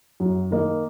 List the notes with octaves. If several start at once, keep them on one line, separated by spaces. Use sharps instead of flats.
F#2
D#3 A#3 D#4